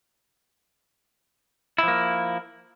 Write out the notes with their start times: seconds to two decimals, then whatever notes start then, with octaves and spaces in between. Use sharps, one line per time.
1.78 E4
1.83 F3
1.88 A#3